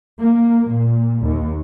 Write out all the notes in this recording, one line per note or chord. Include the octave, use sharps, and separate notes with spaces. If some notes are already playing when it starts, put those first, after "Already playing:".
A#3
A#2
D#2